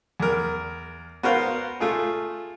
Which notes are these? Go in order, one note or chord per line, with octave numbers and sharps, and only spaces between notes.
E2 A#4
B3 F#4 A#4 C5 F5
A3 F4 G#4